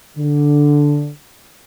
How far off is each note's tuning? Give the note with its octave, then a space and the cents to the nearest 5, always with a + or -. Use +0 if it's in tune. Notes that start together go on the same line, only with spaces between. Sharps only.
D3 -5